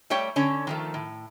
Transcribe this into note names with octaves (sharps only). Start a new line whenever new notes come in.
G3 A3 G4 C#5 G5
D3 C#4 C#5
D#3 F3 A3
A2